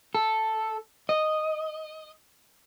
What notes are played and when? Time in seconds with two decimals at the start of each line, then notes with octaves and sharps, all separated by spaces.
0.15 A4
1.09 D#5